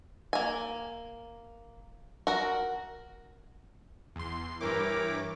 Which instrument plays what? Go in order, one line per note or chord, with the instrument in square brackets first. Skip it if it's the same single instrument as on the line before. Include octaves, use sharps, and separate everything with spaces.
[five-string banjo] A#3 G#5
F#4 A#4
[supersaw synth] E2 C6
[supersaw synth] G2 E3 D6 [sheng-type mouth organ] E4 C#5 G5 [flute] A#4